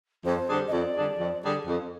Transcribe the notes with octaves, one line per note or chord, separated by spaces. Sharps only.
F2 C5
D3 G3 D4 G#4
D#5
F2 D5
D3 G3 D4 G#4
F2
D3 G3 D4 G#4
F2